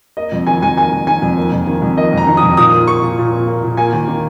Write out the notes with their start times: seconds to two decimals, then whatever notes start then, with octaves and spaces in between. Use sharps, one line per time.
0.17 A#3 D#5
0.32 F2
0.47 D#3 G#5
0.62 F2 G#5
0.77 A#3 G#5
0.92 F2
1.07 D#3 G#5
1.22 F2
1.37 A#3
1.52 F2
1.67 D#3
1.82 F2
1.97 A#3 D#5
2.13 F2 A#5
2.27 D#3
2.37 D#6
2.43 F2
2.57 A#2 D#6
2.73 A#3
2.87 A#3 C#6
3.02 A#2
3.18 A#2
3.33 A#3
3.47 A#3
3.63 A#2
3.77 A#3 G#5
3.93 D#2
4.08 D#3